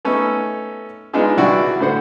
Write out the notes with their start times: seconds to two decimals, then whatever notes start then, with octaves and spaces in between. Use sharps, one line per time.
0.05 A3 B3 C#4 D#4 A4
1.13 G#3 B3 D4 D#4 F4 G#4
1.37 C2 E3 E4 F#4 D5 G5
1.80 A2 D3 A4 C5 F#5